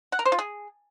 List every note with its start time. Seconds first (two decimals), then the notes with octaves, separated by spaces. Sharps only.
0.12 F#5
0.19 A#4
0.25 C5
0.32 F4
0.39 G#4